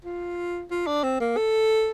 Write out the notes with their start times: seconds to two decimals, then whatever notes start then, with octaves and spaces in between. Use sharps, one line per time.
0.05 F4
0.71 F4
0.87 D4
1.04 C4
1.20 A#3
1.37 A4